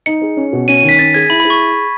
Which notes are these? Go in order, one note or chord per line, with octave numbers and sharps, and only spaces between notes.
D#4 C#7
G#4
C#4
B2
C#4 D#7
D#7
D#3
B6
C#4 A6
G#4 G#6
E4 B5
B5
G#4
C#6